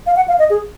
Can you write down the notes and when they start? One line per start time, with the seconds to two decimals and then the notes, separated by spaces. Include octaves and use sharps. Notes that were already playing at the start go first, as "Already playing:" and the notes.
0.06 F5
0.16 F#5
0.28 F5
0.39 D#5
0.50 G#4